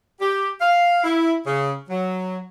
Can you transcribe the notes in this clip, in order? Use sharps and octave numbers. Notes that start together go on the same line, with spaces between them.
G4
F5
E4
C#3
F#3